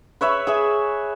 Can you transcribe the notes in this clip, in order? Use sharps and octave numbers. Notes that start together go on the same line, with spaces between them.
B4 C#5 E5 B5
G#4 B4 E5